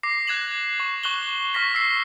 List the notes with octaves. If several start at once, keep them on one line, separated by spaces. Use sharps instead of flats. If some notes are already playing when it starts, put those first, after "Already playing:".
D6 A#6 C7
F#6 G#6 E7 F#7
C#6
C#6 F#6 F#7 G7
C#6 F6 A#6 B6
E6 C7